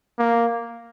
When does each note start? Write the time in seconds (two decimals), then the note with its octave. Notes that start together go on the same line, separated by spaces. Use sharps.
0.19 A#3